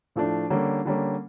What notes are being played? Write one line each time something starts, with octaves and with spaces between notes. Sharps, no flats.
A2 F3 A3 D4
D3 G3 A#3 C#4
D3 G3 A#3 C#4